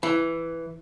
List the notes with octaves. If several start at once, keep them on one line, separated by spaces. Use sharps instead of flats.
E3